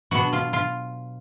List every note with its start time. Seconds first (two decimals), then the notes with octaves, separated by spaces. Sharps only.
0.11 B2 F#3 B3 D4 F#4
0.33 F4
0.53 F4